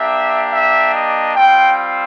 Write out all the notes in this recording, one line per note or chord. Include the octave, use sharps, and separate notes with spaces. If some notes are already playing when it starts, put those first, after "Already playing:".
Already playing: A#3 D4 G4 E5
E5
D#5
G3 C4 F4 G5